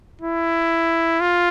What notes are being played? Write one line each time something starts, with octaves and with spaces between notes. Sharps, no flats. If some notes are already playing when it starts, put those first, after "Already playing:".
E4
F4